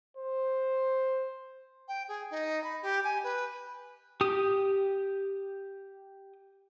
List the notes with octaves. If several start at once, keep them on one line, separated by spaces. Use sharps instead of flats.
C5
G5
G#4
D#4
B5
G4
G#5
B4
G4 D#6